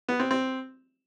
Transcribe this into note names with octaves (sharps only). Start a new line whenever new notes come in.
B3
C4
C4